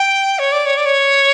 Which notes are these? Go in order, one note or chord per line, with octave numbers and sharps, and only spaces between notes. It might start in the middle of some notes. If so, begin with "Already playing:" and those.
Already playing: G5
C#5
D5
C#5
D5
C#5